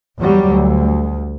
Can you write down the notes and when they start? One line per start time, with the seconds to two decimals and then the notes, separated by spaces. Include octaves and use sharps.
0.17 E2 F#3 G3
0.47 D2